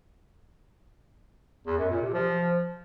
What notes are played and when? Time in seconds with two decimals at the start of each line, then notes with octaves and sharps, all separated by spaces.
1.66 E2
1.78 F#2
1.90 A#2
2.02 C3
2.14 F3